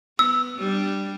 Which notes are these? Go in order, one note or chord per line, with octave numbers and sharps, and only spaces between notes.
B3 E6
G3 D4